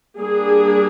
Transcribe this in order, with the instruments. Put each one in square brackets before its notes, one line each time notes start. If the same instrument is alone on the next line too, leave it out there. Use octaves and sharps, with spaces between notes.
[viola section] G3 A#3 D4 G#4